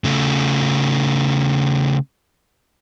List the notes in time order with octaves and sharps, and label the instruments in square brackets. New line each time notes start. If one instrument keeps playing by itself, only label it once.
[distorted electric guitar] C#3 A3